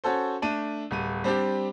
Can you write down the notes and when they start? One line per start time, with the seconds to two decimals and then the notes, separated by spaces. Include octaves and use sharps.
0.04 C#4 F#4 A4 C5
0.42 A3 D4 D#7
0.91 D1 G3 D#7
1.24 G3 C4 D4 G4